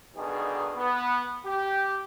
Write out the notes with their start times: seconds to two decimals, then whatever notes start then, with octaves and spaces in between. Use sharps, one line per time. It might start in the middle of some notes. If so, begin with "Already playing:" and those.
0.15 G2 B2 D3 D#3 G#4
0.76 B3
1.44 G4